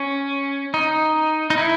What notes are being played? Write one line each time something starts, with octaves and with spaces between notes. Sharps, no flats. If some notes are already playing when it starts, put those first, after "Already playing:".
Already playing: C#4
D#4
D#4
E4